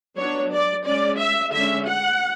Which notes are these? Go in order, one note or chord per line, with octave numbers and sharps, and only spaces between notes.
F#3 B3 D4 C#5
D5
G#3 C#4 D5
E5
D3 G#3 C#4 E5
F#5